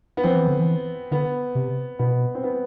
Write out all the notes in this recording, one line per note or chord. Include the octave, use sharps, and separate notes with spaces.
B3
F3 C4
E3
D3
E3
D3 B3
C3
B2 B3
C4
B3